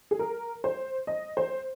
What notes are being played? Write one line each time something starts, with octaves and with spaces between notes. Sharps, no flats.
G#4
A#4
C5
D#5
C5